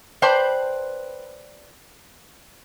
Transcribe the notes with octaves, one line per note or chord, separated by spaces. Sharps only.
B4 C5 D5 G5 A5